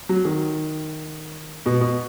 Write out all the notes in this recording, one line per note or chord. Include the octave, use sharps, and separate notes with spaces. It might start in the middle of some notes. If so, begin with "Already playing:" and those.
F#3
D#3
B2
B2